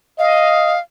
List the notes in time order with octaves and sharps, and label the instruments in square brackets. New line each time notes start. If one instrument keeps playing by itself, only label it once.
[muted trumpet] D#5 [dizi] F5